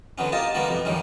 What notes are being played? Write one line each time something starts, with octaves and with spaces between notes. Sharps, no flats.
D3 F#3 B3 C#4
A#3 F4 G4 D#5 A5
D3 G3 A#3 B3 F#4 A4
F2 B2
F#2 D#3 G3 C#4